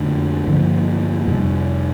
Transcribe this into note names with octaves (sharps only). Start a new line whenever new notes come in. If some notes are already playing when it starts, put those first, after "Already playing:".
Already playing: F2 D3 A3 D4
G2 D3 F3 A#3
F2 C3 G3